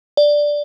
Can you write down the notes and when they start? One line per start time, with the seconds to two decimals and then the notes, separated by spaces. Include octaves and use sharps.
0.17 D5